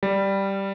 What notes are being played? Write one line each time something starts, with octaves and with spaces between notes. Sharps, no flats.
G3